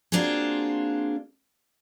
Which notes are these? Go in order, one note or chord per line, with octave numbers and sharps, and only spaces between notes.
A#3 C4 D4 F4 F#4 G#4